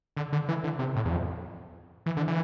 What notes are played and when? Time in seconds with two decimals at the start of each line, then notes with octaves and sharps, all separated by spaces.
0.17 D3
0.33 D3
0.49 E3
0.64 D3
0.79 C3
0.96 A2
1.05 E2
1.12 F2
2.06 E3
2.17 D3
2.28 E3